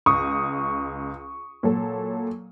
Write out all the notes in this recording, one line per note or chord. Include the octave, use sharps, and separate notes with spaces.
C#2 C#6 D#6
A#2 F#3 A4